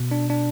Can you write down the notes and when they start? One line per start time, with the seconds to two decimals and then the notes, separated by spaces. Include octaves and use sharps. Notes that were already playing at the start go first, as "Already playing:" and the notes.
Already playing: B2
0.11 D4
0.30 D4